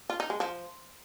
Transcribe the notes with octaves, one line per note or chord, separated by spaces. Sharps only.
F4
D#4
G#3
F3